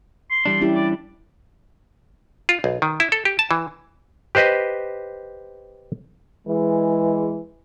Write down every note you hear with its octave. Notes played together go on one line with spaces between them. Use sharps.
C6
E3 G3 D4
C#4 E4 G4
D5
F4
B1
D#3
E4
A4
G4
A5
E3
G4 B4 C5 D#5
E3 G#3